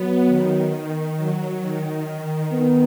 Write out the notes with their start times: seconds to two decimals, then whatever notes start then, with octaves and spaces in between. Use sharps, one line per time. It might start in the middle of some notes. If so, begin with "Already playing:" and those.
Already playing: F#3 B3
0.27 D#3
1.16 F#3
1.61 D#3
2.52 B3